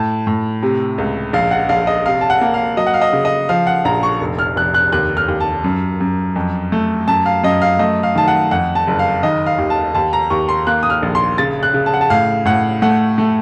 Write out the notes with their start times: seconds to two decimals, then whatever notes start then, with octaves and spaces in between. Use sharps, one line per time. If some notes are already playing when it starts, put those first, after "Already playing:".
Already playing: A2 A5
0.27 A2
0.63 C3
0.98 C#2
1.33 A#1 F5
1.51 F#5
1.69 A#1 F5
1.87 D#5
2.06 C3 F5
2.21 A5
2.30 F#5
2.41 A#3
2.54 F5
2.77 F#3 D#5
2.87 F#5
2.94 F5
3.01 D#5
3.13 C#3
3.25 D#5
3.49 F3 F5
3.67 F#5
3.85 A#1 A#5
4.03 C#6
4.21 F1
4.39 F6
4.56 F1 F#6
4.74 F#6
4.92 D#2 F#6
5.17 F6
5.28 D#2
5.40 A5
5.64 F#2
6.01 F#2
6.36 F2
6.72 A3
7.08 F#2 A5
7.26 F5
7.43 F#2 D#5
7.62 F5
7.79 A3 D#5
8.03 F5
8.15 D#3 A5
8.28 F#5
8.51 F2 F#5
8.75 A5
8.87 F#1
8.99 F5
9.23 D#3 D#5
9.46 F5
9.58 D#2
9.70 A5
9.95 D#2 A5
10.13 A#5
10.30 D#2 C#6
10.49 C6
10.67 A#3 F#6
10.83 D#6
10.90 F6
11.03 A#1
11.15 C6
11.38 C#3 A6
11.63 F#6
11.74 C#3
11.86 A5
11.94 F#5
12.01 A5
12.10 A2 F5
12.45 A2 F#5
12.82 A3 F#5
13.18 A3